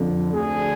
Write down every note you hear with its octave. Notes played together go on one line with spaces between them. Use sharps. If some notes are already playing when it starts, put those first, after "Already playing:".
Already playing: F2 D3
D2 D3 G#4